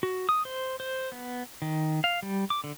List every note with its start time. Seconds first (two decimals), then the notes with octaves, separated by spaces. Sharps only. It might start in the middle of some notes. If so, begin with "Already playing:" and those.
0.03 F#4
0.29 D#6
0.45 C5
0.80 C5
1.12 B3
1.62 D#3
2.04 F5
2.23 G3
2.50 D6
2.64 D3